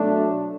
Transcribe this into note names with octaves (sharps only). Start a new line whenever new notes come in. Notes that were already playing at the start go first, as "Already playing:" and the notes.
Already playing: B2 F#3 A3 D4